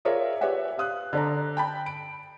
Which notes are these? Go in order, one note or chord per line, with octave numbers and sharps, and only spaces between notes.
F4 G#4 A#4 C#5 D5 E5
G4 B4 C#5 D5 E5 F#5
G4 F5 D#6 F#6
D3 D4 A#5
G5 A5 B5
D7